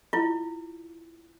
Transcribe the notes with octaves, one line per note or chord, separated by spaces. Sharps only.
E4 F4